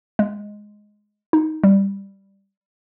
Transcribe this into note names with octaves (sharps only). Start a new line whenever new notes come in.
G#3
D#4
G3